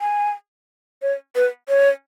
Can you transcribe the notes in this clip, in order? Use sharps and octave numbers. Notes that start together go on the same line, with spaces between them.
G#5
C#5
B4
C#5